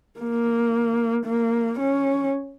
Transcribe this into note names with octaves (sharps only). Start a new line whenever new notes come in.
A#3
A#3
C#4